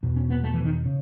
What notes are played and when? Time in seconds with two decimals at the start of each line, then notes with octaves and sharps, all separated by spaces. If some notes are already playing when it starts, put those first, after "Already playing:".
0.03 E2 B2
0.16 C#4
0.30 B3
0.43 A3
0.54 E3
0.64 D#3
0.85 C#3